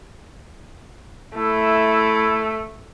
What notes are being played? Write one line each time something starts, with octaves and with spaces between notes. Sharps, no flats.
A3 E4